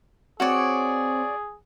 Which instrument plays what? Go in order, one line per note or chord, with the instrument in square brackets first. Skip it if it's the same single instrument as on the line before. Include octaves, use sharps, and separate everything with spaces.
[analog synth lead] C4 [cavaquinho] F#4 C#5 D5 [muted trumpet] G#4